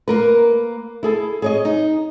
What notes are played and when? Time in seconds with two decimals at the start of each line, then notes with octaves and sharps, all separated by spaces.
0.08 A#3 A#4 B4
1.03 E4 G#4 A4
1.42 G#4 C#5 D#5
1.65 D#4